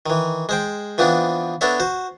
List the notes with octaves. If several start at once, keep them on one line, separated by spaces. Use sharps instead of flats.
D#3 E3
G#3 C5 G5
E3 F3 B3 C4 D4
B3 D4 A4 C#5 E5
F#4 C5